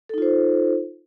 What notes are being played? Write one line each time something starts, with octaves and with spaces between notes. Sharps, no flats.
D#4 F4 A4 C5